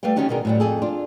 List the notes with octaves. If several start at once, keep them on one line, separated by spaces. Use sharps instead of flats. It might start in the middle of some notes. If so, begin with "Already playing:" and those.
G3 A3 B4 F5 G5
D3 D#3 C#4 D#4 F#4 G4
B2 D3 D#3 G#4 A#4
A2 F#3 G3
F2 G#4 A4
D4 F4